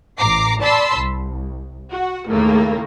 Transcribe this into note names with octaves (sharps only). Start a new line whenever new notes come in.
A1 A#5 D6 C7
D5 A5 B5 C6 E6
C2
F#4 F#5
D#2 A2 C#3 A3 A#3